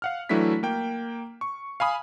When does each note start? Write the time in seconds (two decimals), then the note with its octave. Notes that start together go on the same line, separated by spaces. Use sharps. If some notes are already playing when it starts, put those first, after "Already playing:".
0.02 F5 F#5 F6
0.29 E3 F#3 A3 D4 E4 B6
0.63 A#3 G5
1.41 C#6
1.80 F5 G#5 B5 D#6